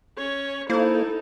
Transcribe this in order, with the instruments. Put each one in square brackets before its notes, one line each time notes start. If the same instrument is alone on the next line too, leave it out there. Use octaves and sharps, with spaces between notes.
[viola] C#4 C#5
[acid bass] A#3 [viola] D#4 A4 [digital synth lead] E4 [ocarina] C5